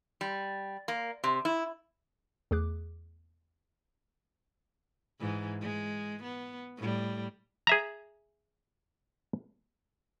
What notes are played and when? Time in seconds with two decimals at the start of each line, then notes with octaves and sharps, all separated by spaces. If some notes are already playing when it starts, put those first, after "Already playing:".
0.21 G3
0.88 A#3
1.24 C3
1.45 E4
2.51 E2 A3 G#4 D6 F#6
5.20 G#2 E3
5.61 G#3
6.23 B3
6.78 A2 G3
7.67 G#4 E5 A#5